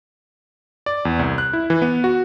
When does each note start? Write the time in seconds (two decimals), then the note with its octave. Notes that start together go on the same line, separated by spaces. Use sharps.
0.86 D5
1.05 E2
1.19 C2
1.38 F#6
1.53 E4
1.70 E3
1.82 B3
2.04 F#4